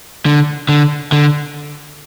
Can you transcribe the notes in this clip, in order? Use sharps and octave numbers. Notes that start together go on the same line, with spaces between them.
D3
D3
D3